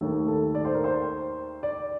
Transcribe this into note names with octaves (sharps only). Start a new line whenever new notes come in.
D#2 D#3 A3 A4
A4
D5
C5
A#4
C5
D5